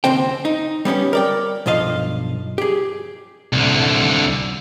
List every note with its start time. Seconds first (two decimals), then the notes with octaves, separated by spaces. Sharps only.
0.04 D#2 C#3 C4 C5 G5
0.45 D#4
0.85 G3 B3 C#4 G4
1.13 A#4 D5 G5
1.66 B1 G2 F3 D#5 F5
2.58 G4 G#4
3.53 C2 D3